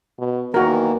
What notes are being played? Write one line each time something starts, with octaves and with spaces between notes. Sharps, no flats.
B2
E2 D#3 E3 A#3 F#4 A#4